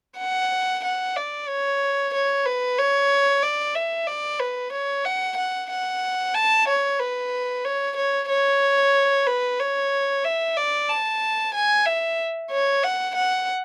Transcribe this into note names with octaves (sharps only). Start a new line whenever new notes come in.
F#5
F#5
D5
C#5
C#5
B4
C#5
D5
E5
D5
B4
C#5
F#5
F#5
F#5
A5
C#5
B4
C#5
C#5
C#5
B4
C#5
E5
D5
A5
G#5
E5
C#5
F#5
F#5